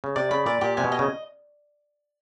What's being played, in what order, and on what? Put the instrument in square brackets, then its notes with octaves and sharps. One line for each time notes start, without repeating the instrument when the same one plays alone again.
[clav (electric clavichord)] C#3
[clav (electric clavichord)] C3 [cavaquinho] D5
[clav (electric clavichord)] C#3 [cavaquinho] B5
[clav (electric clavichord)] A#2 [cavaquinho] D5
[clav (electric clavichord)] A#2 [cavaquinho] G4
[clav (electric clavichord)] C3 [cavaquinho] G#5
[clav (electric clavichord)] B2
[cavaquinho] D#5
[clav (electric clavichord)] C#3